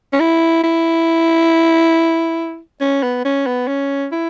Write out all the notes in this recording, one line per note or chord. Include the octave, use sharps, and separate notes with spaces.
C#4
E4
E4
C#4
B3
C#4
B3
C#4
E4